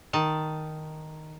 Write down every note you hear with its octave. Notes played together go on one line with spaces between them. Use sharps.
D#3 A5